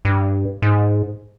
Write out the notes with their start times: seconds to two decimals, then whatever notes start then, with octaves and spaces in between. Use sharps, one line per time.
0.05 G2
0.62 G#2